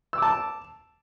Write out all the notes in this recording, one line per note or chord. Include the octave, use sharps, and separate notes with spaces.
A5 D6 E6